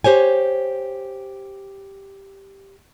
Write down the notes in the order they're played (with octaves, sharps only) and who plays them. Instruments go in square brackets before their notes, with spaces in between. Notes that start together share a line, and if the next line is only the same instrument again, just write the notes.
[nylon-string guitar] G4 C5 C#5 G#5